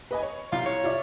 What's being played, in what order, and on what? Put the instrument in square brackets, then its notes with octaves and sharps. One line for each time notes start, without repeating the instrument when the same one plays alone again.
[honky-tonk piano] B4 D#5 G#5
C#5
[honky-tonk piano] C2 [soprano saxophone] F4
[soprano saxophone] C#5
[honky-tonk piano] F4 D5 E5